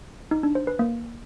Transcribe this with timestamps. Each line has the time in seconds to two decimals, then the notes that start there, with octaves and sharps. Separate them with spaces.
0.31 D#4
0.43 D4
0.55 C5
0.67 B4
0.79 A#3